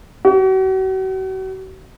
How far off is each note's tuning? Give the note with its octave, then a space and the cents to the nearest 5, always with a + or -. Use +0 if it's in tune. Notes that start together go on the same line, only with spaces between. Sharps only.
F#4 +40